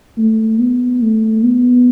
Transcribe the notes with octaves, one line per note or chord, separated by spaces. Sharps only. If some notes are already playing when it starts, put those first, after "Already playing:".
A3
B3
A3
B3